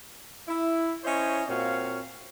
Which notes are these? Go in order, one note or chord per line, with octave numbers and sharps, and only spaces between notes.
E4
C#4 E4 C5 C#5 D#5
A#2 C4 F#4 C#5 F5